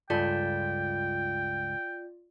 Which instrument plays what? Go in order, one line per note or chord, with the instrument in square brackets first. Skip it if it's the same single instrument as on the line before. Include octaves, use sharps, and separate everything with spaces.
[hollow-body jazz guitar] C#2 G2 A4 [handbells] F4 D5 [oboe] G5